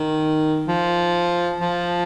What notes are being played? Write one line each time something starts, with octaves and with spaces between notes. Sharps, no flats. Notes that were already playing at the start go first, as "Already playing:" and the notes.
Already playing: D#3
F3
F3